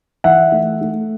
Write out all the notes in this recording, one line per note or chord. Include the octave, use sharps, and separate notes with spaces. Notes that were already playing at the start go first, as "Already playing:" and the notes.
E3 E5 F#5
A3
A3